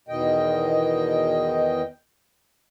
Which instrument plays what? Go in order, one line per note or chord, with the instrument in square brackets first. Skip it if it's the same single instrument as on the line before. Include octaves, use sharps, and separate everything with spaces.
[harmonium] E2 B2 D#3 D#5 G5